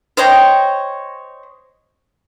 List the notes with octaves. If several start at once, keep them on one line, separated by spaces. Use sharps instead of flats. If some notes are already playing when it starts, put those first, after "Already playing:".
C5 C#5 D#5 G5